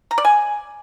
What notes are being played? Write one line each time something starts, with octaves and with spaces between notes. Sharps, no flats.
A#5
D5
G#5